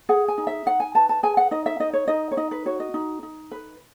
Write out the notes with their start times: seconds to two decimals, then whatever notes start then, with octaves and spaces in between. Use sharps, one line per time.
0.09 G#4 F#5
0.28 G#5
0.38 D#4
0.47 E5
0.66 D#4 F#5
0.80 G#5
0.95 B4 A5
1.09 A5
1.23 G#4 G#5
1.37 F#5
1.51 D#4 D#5
1.66 E5
1.80 D#4 D#5
1.93 C#5
2.08 D#4 D#5
2.31 C#5
2.37 D#4 D#5
2.51 B4
2.66 F#4 C#5
2.80 D#5
2.94 D#4
3.23 D#4
3.51 B4